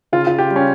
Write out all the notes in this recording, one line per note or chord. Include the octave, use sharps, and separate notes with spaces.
C#3 F4
F4
G4
G3
C#4